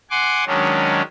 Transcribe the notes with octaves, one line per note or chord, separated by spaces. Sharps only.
F#5 G#5 C6 D6
D#3 F#3 G#3 C#4 D4